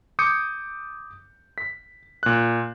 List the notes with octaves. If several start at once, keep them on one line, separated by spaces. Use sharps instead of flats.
D6 D#6 G6 C#7
B6
A#2 F#6